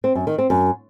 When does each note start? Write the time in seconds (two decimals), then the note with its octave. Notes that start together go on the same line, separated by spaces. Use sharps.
0.04 C4
0.15 F#2
0.27 D#3
0.38 C4
0.50 F#2